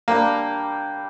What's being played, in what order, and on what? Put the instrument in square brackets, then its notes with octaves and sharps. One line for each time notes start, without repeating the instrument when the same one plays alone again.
[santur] G3 D4 G4 [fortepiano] A#3